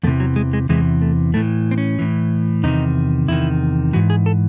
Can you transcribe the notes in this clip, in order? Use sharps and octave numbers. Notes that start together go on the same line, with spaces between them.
E2 C3 E3 A3
F#3
G#3
G#3
E2 C3 E3 G#3
A3
A2 E3 A3
C4
C#4
A2 E3
E2 C3 D#3 D#4
E2 C3 D#3 E4
G#2 E3 F#4
G#4
A4